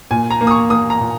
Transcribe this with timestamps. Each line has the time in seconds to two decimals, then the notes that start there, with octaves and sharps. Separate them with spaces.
0.11 A#2 G#5
0.30 A#5
0.41 A#3
0.47 D#6
0.51 C#6
0.70 A#3 D#6
0.90 A#5
1.00 A#2